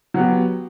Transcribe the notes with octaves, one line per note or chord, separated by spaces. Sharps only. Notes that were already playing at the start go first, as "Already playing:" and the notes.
F#3 B3 G4